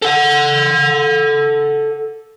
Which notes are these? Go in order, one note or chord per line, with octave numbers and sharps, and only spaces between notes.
A4 F#5